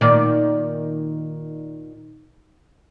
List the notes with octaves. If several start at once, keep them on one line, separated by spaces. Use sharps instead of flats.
A#2 D#3 D5